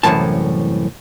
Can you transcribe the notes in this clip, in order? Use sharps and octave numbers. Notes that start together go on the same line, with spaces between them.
C2 F#2 A2 C3 E3 A5